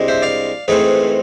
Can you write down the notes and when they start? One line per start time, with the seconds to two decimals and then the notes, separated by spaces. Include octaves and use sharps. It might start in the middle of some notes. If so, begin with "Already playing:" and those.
Already playing: C2 C3 G#3 D4
0.08 C5 E5
0.22 D5 F5
0.68 G#2 E3 A3 C4 G#4 B4